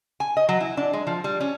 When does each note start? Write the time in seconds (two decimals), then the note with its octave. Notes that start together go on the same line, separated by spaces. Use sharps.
0.20 G#5
0.37 D#5
0.49 F#3
0.61 E4
0.77 D4
0.93 G#3
1.07 F3
1.24 G3
1.41 C#4